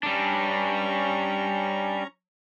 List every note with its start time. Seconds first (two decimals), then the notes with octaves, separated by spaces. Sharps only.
0.03 G3 C#4 D4 A#5 C#6